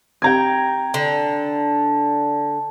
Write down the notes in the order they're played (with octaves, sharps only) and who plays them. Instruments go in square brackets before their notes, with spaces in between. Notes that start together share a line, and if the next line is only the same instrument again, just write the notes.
[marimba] C4 G4 [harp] G5 A#5 G#6
[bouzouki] D3